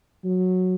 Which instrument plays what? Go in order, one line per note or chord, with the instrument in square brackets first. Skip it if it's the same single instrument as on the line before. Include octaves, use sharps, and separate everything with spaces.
[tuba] F#3